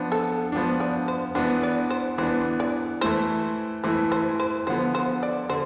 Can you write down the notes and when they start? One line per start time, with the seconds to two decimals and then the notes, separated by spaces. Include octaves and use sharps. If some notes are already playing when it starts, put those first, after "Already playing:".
Already playing: F3 B3 D4
0.12 A4
0.52 F3 B3 D4
0.80 D5
1.08 C5
1.35 E3 B3 D4 C5
1.63 D5
1.90 C5
2.18 E3 B3 D4 C5
2.60 D5
3.01 E3 A3 E4 C5
3.84 E3 A3 E4 C5
4.12 C5
4.39 C5
4.67 D3 F3 B3 C5
4.95 C5
5.23 D5
5.50 D3 C5